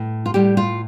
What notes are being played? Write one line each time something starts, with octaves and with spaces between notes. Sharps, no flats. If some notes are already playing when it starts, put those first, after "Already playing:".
Already playing: A2
F4
A2 G3 G4
F4